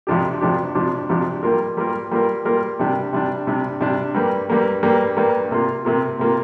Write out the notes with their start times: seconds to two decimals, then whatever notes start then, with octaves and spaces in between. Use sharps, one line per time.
0.07 F2 C3 F3 D4 G4
0.41 F2 C3 F3 D4 G4
0.75 F2 C3 F3 D4 G4
1.09 F2 C3 F3 D4 G4
1.43 G3 A#3 F4 A#4
1.77 G3 A#3 F4 A#4
2.11 G3 A#3 F4 A#4
2.45 G3 A#3 F4 A#4
2.79 C3 G3 D4
3.13 C3 G3 D4
3.47 C3 G3 D4
3.81 C3 G3 D4
4.14 G2 G3 A#3
4.50 G2 G3 A#3
4.83 G2 G3 A#3
5.17 G2 G3 A#3
5.51 C3 A#3 F4
5.85 C3 A#3 F4
6.19 C3 A#3 F4